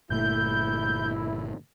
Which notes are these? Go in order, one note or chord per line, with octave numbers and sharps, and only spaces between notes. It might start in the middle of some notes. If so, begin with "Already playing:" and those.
G1 A#2 A3 E4 G6